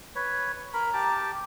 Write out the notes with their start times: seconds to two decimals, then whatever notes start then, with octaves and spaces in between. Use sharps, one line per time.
0.16 B4 C#5
0.74 A#4 A#5 B5
0.93 G4 A5 D6